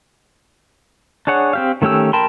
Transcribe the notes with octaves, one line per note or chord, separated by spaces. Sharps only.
D4 G#4 C#5 F#5
C4 G4 F5
D#3 A3 C#4 G4 E6
A#4 G5 A5 B5 C6